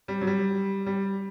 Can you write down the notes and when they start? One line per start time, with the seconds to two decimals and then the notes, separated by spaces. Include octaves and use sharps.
0.08 G3
0.21 F#3
0.27 G3
0.86 G3